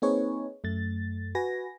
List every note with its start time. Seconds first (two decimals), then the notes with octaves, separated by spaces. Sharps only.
0.02 A#3 C4 D#4 G#4 B4 C#5
0.64 F#2 A3 A6
1.35 F#4 B4 G#5 A#6